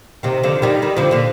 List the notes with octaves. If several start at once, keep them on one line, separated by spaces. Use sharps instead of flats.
C3 D#3
D3 F3
D#3 G3
D#3 G3
D3 F3
A#2 D3